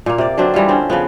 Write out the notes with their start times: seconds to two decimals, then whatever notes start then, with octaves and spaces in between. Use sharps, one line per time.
0.06 A#2 A#3
0.18 C3 D5
0.38 D3 F#3 C4 D4
0.54 E3 G3 E4 F4
0.68 D3 C4 C#4
0.90 C#3 F3 B3